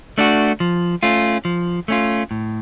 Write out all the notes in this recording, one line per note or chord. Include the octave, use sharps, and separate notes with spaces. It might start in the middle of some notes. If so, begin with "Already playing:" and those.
A3 D4 F#4
F3
A3 C#4 F4
F3
A3 C#4 F4
A2